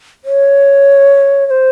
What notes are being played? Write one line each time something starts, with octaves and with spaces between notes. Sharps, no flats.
C#5
C#5
C5